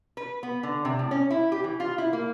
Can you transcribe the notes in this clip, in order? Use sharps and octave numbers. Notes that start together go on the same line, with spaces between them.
B4
B3
D3
C3
A2
C#4
E4
G4
E3
F4
E4
A#3